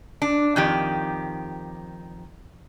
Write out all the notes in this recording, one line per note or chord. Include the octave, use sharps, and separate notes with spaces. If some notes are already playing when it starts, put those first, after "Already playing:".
D4
F2 D#3 G4